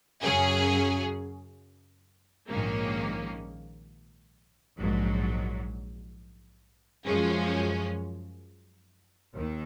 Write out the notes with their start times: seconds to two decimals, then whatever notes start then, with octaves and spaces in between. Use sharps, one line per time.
0.21 F#2 C#3 F#3 C#4 G#4
2.49 A#1 G#2 D#3 A#3 C#4
4.77 A#1 G#2 F#3
7.05 F#2 F3 G#3 C#4
9.33 D#2 D#3